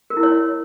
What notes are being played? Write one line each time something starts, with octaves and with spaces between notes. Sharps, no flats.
A#4
E4
C#5